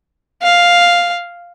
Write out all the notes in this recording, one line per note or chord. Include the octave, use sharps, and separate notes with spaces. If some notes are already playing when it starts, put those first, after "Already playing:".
F5